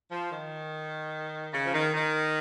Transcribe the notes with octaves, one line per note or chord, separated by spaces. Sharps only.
F3
D#3
C#3
F3
D#3
D#3